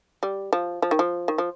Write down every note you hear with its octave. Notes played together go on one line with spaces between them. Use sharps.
G3
F3
F3
D#3
F3
D#3
F3